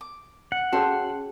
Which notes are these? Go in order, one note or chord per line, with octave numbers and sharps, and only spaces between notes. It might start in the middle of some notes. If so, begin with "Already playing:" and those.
D6
F#5
C#4 F#4 G#4 A4 C#5 G5 C6